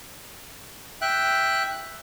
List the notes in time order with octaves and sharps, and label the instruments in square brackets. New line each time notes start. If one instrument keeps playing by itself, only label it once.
[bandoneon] E5 G5 F#6